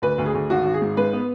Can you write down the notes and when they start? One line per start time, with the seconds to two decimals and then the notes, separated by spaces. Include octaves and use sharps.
0.02 D2 B4
0.18 D2
0.26 G#4
0.34 D2
0.50 G#1 F#4
0.66 G#1
0.74 G#4
0.82 G#2
0.97 G#3 B4
1.13 B3